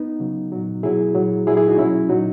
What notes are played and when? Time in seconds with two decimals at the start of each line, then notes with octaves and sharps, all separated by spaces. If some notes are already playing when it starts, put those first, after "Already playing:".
Already playing: B3 D#4
0.20 C#3 F#3
0.52 A#2 F#3
0.83 B2 F#3 E4 G#4
1.15 A#2 F#3
1.47 A#2 F#3 E4 G#4
1.57 E4 G#4
1.68 D#4 F#4
1.78 B2 F#3 C#4 E4
2.09 A#2 F#3 D#4 F#4